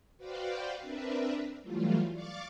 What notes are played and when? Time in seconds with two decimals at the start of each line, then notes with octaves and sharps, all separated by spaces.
0.17 F#4 B4 C5 D5 F5 G5
0.81 C4 D4 A#4 B4 E5
1.63 E3 F#3 G3 A3 F4
2.11 D5 F5 C#6 D6 A6